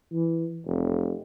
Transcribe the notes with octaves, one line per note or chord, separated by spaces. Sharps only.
E3
F1